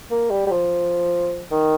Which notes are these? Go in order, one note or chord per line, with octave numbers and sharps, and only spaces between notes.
A#3
G3
G3
F3
D#3